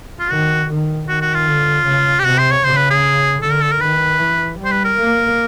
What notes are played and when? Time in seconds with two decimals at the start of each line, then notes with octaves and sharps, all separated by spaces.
0.19 F4
0.30 D#3 F#4
0.69 D#3
1.08 D#3 F#4
1.21 F#4
1.34 F4
1.47 D3
1.86 C#3
2.19 G4
2.25 C3 F#4
2.38 C5
2.51 C#5
2.64 C#3 C5
2.77 B4
2.90 G#4
3.42 D3 A4
3.52 A#4
3.61 A4
3.71 A#4
3.81 D#3 B4
4.19 E3
4.59 G3
4.65 C5
4.72 B4
4.84 A#4
4.98 A#3